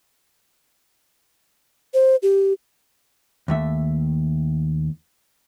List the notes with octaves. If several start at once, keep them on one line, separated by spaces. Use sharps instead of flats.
C5
G4
D#2 A3 E5